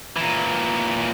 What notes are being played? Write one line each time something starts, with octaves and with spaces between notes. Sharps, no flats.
A#2 E3